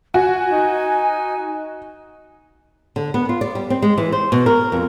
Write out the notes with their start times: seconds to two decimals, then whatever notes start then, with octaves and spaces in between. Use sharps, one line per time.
0.14 F#4 G#5
0.52 D#4
2.96 D3
3.14 B3
3.29 F4
3.41 D5
3.55 G3
3.70 C4
3.82 G#3
3.98 E3
4.12 C5
4.32 B2
4.46 A#4
4.72 F2